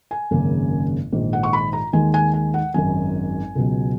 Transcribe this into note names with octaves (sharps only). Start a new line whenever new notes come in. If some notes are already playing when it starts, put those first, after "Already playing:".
G#5
G#1 F#2 C#3 F#3 A#3
A#1 G#2 D#3
F#5
C#6
B5
A#5
D#2 D#3 G#3 G#5
G#5
G#5
F#5
G#1 F#2 D#3 F#3 G#5
C#2 B2 F#3